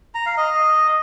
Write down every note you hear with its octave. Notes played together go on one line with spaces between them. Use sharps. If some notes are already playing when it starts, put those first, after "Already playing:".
A#5
F5
D#5